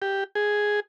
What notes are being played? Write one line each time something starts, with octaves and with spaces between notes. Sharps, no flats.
G4
G#4